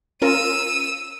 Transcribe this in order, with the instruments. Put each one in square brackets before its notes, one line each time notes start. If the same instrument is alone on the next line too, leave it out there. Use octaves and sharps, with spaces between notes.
[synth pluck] C#4 F4 A#4 [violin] E6 D#7